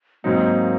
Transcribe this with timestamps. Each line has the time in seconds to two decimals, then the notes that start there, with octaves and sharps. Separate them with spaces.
0.24 G#2 F#3 A#3 C4 D#4